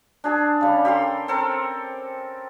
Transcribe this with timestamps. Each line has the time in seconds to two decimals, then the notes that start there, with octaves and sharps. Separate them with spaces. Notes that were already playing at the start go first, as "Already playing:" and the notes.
0.24 D4 G#4 A5
0.61 C#3 G3
0.85 G4 A4 A#4 C6
1.28 C4 A4 A#4